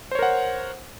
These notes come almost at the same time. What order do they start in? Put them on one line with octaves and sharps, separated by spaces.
C5 C#5 A#4 F#5